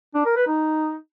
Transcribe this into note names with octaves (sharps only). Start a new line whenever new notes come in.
D4
A#4
B4
D#4